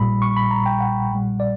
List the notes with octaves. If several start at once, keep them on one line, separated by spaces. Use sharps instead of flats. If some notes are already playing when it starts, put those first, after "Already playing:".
Already playing: A#1 A#2 G3 B5
C#6
B5
A#5
G5
F#5
A#1 A#2 G3
D5